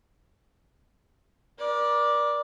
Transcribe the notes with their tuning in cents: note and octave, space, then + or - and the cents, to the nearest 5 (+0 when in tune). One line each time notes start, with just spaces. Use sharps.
A#4 +35 D5 +0